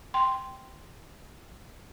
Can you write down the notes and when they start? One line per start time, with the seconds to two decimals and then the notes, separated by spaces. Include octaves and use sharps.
0.14 G5 C6